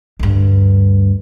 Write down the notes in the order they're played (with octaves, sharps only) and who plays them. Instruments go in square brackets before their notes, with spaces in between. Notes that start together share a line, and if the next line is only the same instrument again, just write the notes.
[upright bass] D2 G2